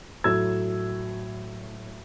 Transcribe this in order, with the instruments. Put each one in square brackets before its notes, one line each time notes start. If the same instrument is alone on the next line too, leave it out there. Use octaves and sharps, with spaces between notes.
[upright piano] A2 F#3 A3 E6 G#6